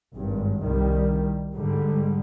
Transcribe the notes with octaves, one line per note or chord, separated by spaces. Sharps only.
G#1 G2
C2 D#3 G3
G#2 D3 G3